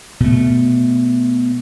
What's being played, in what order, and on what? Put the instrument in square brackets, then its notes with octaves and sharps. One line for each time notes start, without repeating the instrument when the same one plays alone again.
[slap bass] B2 A3